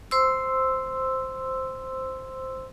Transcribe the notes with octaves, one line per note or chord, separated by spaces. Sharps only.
C5 C6 E6